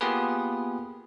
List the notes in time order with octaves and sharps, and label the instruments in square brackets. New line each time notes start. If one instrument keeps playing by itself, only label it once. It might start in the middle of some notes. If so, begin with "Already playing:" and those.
[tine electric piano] A#3 B3 F4 G4 G#4 B4